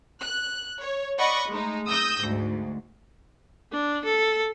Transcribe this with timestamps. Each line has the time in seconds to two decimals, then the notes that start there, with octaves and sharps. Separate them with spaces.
0.23 F#6
0.80 C#5
1.19 D5 D#5 F#5 B5 C#6
1.49 G#3 A3 D#4
1.88 D#6 E6 G6 A#6
2.23 D2 G#2
3.72 D4
4.04 A4